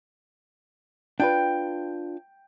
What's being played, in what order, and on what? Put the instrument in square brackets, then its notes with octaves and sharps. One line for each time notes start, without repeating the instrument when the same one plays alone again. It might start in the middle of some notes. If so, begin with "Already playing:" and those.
[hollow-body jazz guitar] D4 F4 B4 [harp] G5